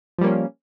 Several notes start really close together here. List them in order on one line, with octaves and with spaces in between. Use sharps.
F3 G3 A#3 C#4